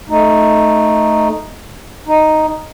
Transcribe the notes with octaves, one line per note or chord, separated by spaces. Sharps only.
A3 D#4
D#4